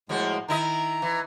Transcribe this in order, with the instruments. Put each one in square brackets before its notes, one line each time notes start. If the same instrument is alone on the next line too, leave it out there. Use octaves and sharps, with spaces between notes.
[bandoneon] A2 G#3 [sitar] F3 A#3 F#4
[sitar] D#3 E4 D#5 [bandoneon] A#5
[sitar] E3